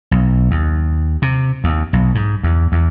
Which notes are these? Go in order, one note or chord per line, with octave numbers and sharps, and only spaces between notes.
B1
D#2
C3
D#2
B1
G#2
E2
E2